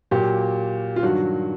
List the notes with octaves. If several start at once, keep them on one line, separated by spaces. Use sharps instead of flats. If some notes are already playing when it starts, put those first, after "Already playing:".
A#2 F#3 G4
F4
G2 D#3 F#3 F#4